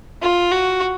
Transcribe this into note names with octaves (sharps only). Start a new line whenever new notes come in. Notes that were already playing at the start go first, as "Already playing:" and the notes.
F4
F#4